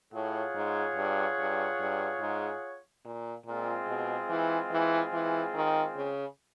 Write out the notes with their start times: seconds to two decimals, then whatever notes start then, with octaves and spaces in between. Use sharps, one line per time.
0.13 A2 F4 G#4 C#5 F#5
0.55 G#2
0.96 G2
1.39 G2
1.80 G2
2.21 G#2
3.05 A#2
3.46 A#2 G#3 C4 F4 G#4
3.87 B2
4.29 E3
4.72 E3
5.13 E3
5.54 D#3
5.96 C#3